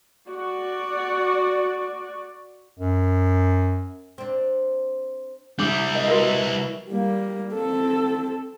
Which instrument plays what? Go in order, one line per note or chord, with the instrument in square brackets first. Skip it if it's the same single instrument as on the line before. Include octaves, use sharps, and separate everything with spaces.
[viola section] F#4 D5
[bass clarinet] F#2
[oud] C4 D4
[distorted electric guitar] G3 E4 [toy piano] D4 D6 D#6 [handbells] G6
[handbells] A#4 D#5
[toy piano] F#4 A#4 E5 [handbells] B4
[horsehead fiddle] G3 A#3
C4 A4